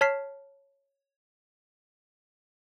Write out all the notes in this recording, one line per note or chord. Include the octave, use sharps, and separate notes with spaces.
C#5 A5 F6 B6 C7